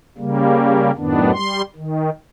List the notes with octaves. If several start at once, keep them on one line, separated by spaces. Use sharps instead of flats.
C#3 G3 A#3
F#2 A2 D#3 B3 D4
G3 C6
D#3